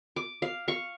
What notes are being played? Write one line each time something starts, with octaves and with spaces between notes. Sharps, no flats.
D6
F5
F5 C#6